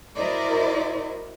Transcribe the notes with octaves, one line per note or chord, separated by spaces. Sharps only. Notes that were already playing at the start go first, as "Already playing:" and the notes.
E4 F#4 A#4 C5 D5 D#5